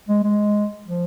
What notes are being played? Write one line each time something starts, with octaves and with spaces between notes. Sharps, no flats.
G#3
G#3
F3